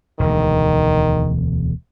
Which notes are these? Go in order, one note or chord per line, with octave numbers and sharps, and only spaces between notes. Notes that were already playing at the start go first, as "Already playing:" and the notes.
E1 D2 D#3